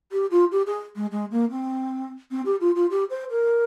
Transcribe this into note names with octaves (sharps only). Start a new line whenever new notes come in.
G4
F4
G4
G#4
G#3
G#3
A#3
C4
C4
G4
F4
F4
G4
C5
A#4